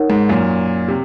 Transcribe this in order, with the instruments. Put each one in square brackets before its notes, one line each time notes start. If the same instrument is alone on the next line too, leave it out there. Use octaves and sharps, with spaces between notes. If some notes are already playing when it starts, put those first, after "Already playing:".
Already playing: [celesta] D#4 A#4 C#5 F#5
[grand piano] G#2
F#2 A#2
C3